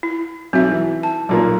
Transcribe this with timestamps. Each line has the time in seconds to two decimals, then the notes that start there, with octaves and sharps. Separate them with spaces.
0.03 E4
0.53 B1 C4 F#4 E5
0.71 E3
1.03 A5
1.29 B1 A#2 A#3